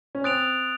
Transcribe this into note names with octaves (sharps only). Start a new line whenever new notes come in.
C#4
C4 D#6 F#6 A6 D7 F7